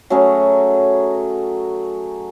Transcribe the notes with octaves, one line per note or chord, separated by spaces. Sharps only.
F#3 A3 C#4 G#4